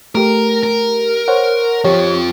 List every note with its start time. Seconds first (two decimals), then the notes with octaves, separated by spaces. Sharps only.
0.15 A3 G4 A#4
0.63 A#4
1.28 C5 C#5 F#5
1.84 F2 F3 G4 C#5